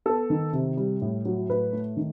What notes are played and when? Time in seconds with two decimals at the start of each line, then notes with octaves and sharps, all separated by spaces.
0.06 B3 A4
0.30 D#3
0.53 C3
0.77 G3
1.01 A2
1.25 F#3
1.49 A2 B4
1.73 A3
1.97 D#3